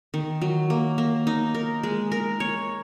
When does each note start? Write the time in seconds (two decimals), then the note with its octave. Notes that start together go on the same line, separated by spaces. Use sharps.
0.14 D#3
0.42 F#3
0.70 A#3
0.98 A#3
1.27 D#4
1.55 A#4
1.83 G#3
2.12 A#4
2.40 C#5